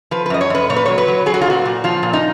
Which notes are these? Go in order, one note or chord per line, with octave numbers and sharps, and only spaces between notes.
F3 B4
B4
F#2 D#5
C#5
F#2 B4
A#2 C#5
B4
F#3 C#5
B4
F#3
F#3 G#4
F#4
F4
A#2 F#4
A#2
F3 F4
A#2
D#4